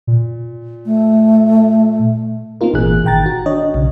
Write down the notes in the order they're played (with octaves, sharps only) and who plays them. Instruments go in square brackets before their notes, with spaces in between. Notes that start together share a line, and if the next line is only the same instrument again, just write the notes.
[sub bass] A#2
[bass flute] A3
[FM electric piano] A#3 C4 D#4 F4 A#4
G#1 A#2 E3 G#4 F#6
G#1 D#3 G5 A#5 A6
F#4
D4 C#5 D#5
B1 C#3